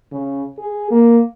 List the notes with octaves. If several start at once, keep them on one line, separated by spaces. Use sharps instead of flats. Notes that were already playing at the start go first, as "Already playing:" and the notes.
C#3
G#4
A#3